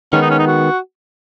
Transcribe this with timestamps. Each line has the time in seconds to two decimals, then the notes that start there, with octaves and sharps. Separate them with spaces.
0.13 D#3 G#3 B3 C#4
0.22 D#4
0.31 C#4
0.39 D#4
0.47 F#4